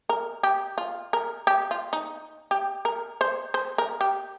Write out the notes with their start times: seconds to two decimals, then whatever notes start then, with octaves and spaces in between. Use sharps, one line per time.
0.09 A#4
0.43 G4
0.78 F4
1.13 A#4
1.47 G4
1.71 F4
1.93 D#4
2.51 G4
2.85 A#4
3.21 C5
3.54 C5
3.78 A#4
4.01 G4